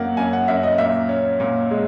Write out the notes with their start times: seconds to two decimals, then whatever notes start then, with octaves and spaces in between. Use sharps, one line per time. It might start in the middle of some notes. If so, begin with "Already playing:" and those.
Already playing: F#2 A#3 F#5
0.17 F#2 G#5
0.33 F#5
0.48 F#2 E5
0.63 D#5
0.78 A#2 E5
1.09 C#4
1.40 A#2
1.71 G#3